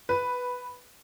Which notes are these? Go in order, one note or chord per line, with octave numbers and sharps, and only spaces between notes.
B4